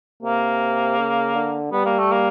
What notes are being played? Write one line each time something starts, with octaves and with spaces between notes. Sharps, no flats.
C3 A#3
C#3
D3
G3 B3
A#3
A3
A#3